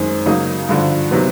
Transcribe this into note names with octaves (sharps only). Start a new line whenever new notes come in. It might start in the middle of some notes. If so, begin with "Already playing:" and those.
Already playing: F#2 D#3 G#3 C4
C#3 F#3 A#3 D#4
G2 D3 F3
C3 D#3 F#3 B3